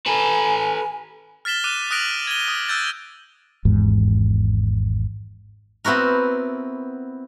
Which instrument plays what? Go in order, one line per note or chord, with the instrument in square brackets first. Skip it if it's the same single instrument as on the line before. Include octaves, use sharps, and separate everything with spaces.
[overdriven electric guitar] A4 B4 [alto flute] G#5
[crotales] F6 A6 B6 E7 G7
D6 F#6 D#7 E7
D#6 F6 F#6 A#6 D7 F7
G#6 D#7 G7
D#6
E6 F#6 G6 A6
[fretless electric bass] G#1 E2 G#2
[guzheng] B3 C4 E4 F#4 A#4